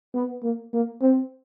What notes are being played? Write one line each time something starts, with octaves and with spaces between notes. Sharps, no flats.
B3
A#3
A#3
C4